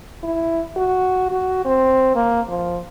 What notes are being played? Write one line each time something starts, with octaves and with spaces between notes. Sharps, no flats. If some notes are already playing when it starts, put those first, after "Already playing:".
E4
F#4
F#4
C4
A#3
F3